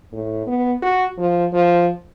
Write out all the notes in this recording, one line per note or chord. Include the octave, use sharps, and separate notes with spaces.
A2
B3
F#4
F3
F3